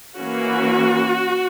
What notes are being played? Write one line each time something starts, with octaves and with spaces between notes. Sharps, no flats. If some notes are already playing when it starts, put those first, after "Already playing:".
E3 A#3 C#4 F#4